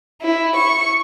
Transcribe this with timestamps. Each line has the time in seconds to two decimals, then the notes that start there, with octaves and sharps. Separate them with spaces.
0.22 E4
0.55 C#6